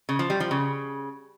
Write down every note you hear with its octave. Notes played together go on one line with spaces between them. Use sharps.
C#3
F3
G3
F3
C#3